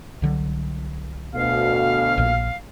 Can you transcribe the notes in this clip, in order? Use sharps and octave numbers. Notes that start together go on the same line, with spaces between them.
C2 D3 F#3
D2 B2 F5
A#1 A#2